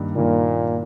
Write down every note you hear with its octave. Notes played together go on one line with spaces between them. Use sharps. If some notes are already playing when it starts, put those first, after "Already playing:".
Already playing: G2 D#3 A#3
G2 A#2 D#3 A#3